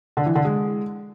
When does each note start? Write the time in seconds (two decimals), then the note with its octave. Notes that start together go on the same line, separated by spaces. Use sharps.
0.17 D3
0.26 E3
0.35 D3
0.45 G#3